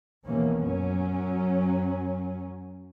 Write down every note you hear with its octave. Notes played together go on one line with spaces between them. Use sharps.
A#1 D#2 B2 E3 A#3 C#4
F#2 F#3 C#4